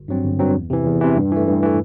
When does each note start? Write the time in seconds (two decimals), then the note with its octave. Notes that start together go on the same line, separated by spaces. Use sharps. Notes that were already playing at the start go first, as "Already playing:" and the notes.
Already playing: G1
0.08 G2 F#3 C4
0.24 G1
0.39 G2 F#3 C4
0.55 E2
0.70 C3 E3
0.86 E2
1.01 C3 E3
1.17 G2
1.32 E3 A3
1.47 G2
1.63 E3 A3